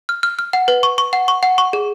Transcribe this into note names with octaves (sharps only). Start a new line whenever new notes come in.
F6
F6
F6
F#5
B4
C#6
C#6
F#5
C#6
F#5
C#6
G#4